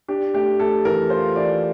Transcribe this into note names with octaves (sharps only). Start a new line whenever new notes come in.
D4 G4
A3 G4
A3 A4
E3 A#4
F4 C5
E3 D5